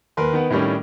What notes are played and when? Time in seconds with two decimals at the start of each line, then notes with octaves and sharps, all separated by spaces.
0.17 D#2 A#4 B4 C6
0.33 D#3 B3 B4 F#5
0.50 A2 D#3 G3 C#4 D4